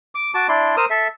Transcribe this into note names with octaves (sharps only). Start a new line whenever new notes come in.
D6
F#4 A5 D6
D4 E4 D5 C6
A#4 C5 D#6 E6
A4 E5